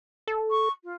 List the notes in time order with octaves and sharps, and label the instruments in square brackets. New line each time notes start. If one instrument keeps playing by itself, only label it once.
[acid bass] A4
[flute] C#6
F4